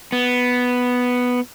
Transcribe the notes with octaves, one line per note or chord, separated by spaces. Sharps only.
B3